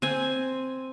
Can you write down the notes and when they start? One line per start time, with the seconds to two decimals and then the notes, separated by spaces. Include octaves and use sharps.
0.02 C4 G#5